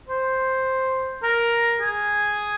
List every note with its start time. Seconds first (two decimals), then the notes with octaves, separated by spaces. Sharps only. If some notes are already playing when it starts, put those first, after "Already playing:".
0.09 C5
1.23 A#4
1.81 G#4